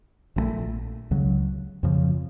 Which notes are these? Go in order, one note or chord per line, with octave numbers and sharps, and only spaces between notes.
A#1 A#2 F3 A3
C#2 C#3 F#3
F2 C#3 F3